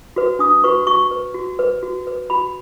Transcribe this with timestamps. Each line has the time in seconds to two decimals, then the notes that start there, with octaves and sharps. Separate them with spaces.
0.16 F#4 B4
0.39 D4 D#6
0.64 F#4 B4 C#6
0.87 F#4 C#6
1.11 B4
1.34 F#4
1.59 B4
1.83 F#4
2.07 B4
2.30 F#4 B5